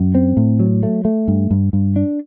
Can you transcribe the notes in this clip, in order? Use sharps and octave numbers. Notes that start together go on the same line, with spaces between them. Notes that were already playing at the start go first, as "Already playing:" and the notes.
Already playing: F#2
C4
A2
F#3
A3
A3
G2
G2
G2
D4